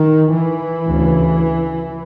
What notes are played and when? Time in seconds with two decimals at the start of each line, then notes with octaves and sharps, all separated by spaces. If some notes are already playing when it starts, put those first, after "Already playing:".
Already playing: D#3
0.33 E3
0.86 D2 C#3